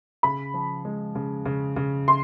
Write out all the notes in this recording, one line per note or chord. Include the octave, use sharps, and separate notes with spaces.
C#3 B5
F3
G#3
C#3
C#3
C#3
C6